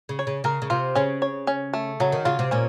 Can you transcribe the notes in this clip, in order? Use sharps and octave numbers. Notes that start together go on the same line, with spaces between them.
C#3
C#5
C#3
C#3 A#4
C#3
C3 F4
C#3 C#4
C#5
C#4
A3
C#3 F#3
D#3
C#3 F4
C3
A#2 C#4